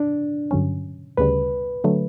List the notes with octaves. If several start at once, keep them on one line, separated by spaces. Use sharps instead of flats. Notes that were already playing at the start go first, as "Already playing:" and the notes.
Already playing: D4
G2 D3 F#3 C#4
D2 C#3 G3 B4
D3 F#3 A3